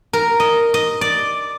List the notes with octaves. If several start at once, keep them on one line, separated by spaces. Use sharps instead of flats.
A#4
D#5
D#5
D5